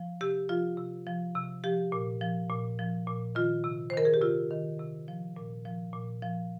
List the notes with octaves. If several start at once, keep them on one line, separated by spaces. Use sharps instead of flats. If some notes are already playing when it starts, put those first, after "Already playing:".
Already playing: F3
C3 G4
F3 F4
C3
F3
C3
F3 G4
A#2
F3
A#2
F3
A#2
D#3 F4
C3
C5
D#3 A#4
G#4
G4
C3 F4
D#3
C3
F3
A#2
F3
A#2
F3